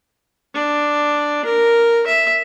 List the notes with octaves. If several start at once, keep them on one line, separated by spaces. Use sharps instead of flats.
D4
A#4
E5